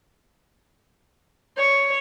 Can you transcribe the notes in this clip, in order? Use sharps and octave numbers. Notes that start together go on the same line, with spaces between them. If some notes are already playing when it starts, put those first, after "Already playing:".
C#5